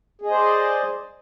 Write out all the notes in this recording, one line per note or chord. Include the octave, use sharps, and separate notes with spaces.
G#4 C5 D5 D#5